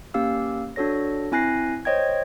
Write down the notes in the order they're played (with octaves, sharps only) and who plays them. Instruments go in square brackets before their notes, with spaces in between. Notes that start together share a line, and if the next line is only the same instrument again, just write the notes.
[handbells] A#3 C#4 G4 F5 E6
D4 F#4 A4 C#5 A#6
C4 E4 G#5 F#6 A#6 C7
C5 C#5 D#5 G5 G#6